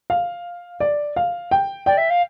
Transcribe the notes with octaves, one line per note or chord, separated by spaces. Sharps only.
F5
D5
F5
G5
D5 G5
E5
F5